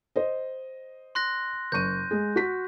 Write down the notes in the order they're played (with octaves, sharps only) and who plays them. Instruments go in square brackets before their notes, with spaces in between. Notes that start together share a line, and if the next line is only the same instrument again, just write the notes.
[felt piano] C5 D#5
[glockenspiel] C6 F#6 A#6
[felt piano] F#1 C#6 D#7 [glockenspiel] G6
[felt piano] G#3 G#4
F#4 B6